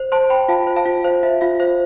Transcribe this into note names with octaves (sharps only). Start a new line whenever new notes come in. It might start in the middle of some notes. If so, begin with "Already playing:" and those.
Already playing: C5
C5 A5 C6
C5 G5 B5
F4 F5 A5
C5
F5 A5
F4
C5 F5
F4 E5
F4 F5
C5 F5